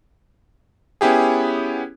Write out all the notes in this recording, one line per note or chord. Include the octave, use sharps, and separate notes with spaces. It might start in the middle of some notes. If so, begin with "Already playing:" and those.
B3 C#4 E4 G4 G#4